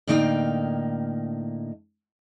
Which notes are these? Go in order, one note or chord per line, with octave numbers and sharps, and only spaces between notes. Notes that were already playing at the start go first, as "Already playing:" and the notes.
A2 D3 A#3 D#4 F5 G5